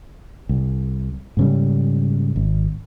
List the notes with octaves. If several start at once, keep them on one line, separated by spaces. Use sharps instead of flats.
C2
G#2 C#3 G3
G#1